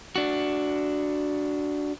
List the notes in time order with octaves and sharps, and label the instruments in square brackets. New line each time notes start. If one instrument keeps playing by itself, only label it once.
[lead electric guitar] D4 F#4